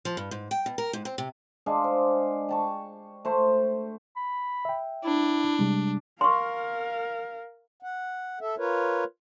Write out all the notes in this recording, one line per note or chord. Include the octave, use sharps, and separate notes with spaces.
F3
G2
G#2
G5
B2
A#4
G#2
C4
C3
G#3 D4 F5
C5
G5 A5 C#6
A3 C5
B5
E5 G5
D4 E4
C3 G3 G#3
A#4 F5 C6 C#6
F#5
A4 E5
F4 A#4 B4 C#5